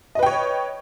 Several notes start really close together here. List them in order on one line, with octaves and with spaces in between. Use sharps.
D#5 B4 G5 C#5